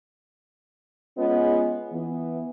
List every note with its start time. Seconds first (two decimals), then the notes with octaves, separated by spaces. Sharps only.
1.17 G#3 B3 C#4 F4 G#4 D#5
1.92 E3 B3